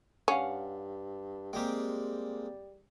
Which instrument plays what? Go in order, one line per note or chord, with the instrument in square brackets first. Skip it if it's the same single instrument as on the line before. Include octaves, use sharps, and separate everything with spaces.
[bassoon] G2 [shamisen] C#4 [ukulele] F5 F#5
[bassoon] G3 [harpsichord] G#3 A#3 C4 [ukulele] G4 G5